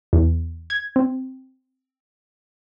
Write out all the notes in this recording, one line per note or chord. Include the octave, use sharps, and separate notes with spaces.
E2
G#6
C4